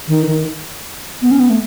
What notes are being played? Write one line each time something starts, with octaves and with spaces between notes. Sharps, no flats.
D#3
D#3
B3
C#4
B3
A3